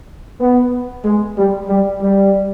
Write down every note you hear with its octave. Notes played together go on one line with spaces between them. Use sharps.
B3
G#3
G3
G3
G3